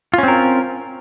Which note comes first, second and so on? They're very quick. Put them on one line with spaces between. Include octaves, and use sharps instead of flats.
F4 C#4 C4 A#4